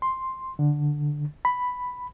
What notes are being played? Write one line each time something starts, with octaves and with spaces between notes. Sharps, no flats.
C6
D3
B5